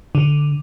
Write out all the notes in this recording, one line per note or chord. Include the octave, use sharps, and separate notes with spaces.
D3